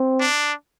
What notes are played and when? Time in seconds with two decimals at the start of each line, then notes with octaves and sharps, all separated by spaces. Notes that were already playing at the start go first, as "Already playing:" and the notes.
Already playing: C4
0.20 D4